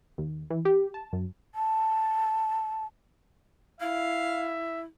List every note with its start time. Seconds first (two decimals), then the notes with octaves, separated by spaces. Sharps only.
0.18 D#2
0.50 E3
0.65 G4
0.94 A5
1.13 F#2
1.55 A5
3.81 E4 E5 F5